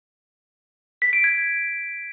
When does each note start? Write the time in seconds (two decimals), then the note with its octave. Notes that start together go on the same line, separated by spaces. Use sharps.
1.02 B6
1.13 D7
1.24 G#6